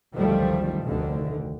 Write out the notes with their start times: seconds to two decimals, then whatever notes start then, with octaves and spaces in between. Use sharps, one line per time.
0.16 F#1 D2 D#3 F3 G3 A3
0.83 F1 D2 D3 D#3